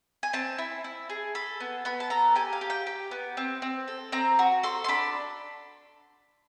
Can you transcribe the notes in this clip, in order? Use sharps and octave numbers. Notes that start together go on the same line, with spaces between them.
G#5
C4 A5
E4
E4
G#4
A4 B5
B3
B3 B5
A5
A4 A#5
G4 G#5
F5
G4
G5
G4
B3
C4
C4
A4
C4 A#5
F#4
A4 C6
C6
D4 B5